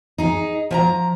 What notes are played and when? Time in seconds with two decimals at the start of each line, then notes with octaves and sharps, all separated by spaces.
0.18 D#4 G#4
0.71 F3 G#5 A#5